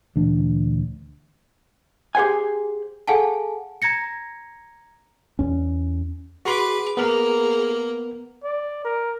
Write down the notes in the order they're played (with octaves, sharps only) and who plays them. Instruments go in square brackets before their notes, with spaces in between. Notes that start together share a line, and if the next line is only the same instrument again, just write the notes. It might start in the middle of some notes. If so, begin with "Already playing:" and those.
[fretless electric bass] D2 A#2 E3 D4
[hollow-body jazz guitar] G4 G#4 C5 F#5 G#5
[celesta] G#4 A4 F5 F#5 G#5 A5
A#5 G#6 A#6 C#7
[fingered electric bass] E2 C#4
[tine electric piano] F#4 C6 [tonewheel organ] G#4 [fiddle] B4 D6
[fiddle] A#3 [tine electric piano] B3 A#4
[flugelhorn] D5
A#4